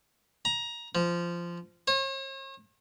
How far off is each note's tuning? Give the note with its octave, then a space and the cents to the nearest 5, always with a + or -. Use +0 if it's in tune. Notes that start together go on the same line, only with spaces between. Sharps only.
A#5 +20
F3 -15
C#5 -45